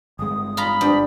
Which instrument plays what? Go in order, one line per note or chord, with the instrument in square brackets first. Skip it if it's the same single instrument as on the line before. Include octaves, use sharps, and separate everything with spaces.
[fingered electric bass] G1 G#3 [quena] D#6
[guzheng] F4 A#5 [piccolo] B5
[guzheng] G2